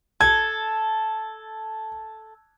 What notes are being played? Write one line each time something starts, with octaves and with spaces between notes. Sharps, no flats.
A4 G#6